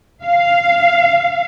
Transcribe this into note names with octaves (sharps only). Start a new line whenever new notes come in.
F5